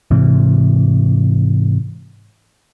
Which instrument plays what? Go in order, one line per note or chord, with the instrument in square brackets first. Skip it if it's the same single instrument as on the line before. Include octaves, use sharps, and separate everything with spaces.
[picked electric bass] G#2 C3 E3